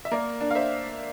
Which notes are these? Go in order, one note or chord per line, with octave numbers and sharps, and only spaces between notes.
E5
A#3 A#4 D5
D4
F5
C5 E5